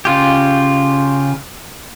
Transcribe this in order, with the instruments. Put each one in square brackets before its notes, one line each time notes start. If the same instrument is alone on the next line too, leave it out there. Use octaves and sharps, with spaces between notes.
[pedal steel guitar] C#3 F4 G4